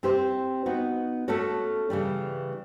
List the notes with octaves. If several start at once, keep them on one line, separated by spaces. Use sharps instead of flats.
C4 E4 G4 C5
B3 D#4 F#4
A3 C#4 F#4 A4 C#5
C#3 E3 G3